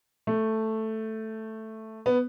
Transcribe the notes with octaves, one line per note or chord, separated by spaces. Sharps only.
A3
B3